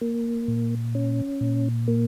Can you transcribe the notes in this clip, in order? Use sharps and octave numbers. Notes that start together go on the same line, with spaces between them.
A#3
A#2
C#4
A#2
A#3